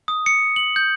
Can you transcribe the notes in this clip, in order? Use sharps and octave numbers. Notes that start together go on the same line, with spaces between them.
D#6
C#7
F#7
G6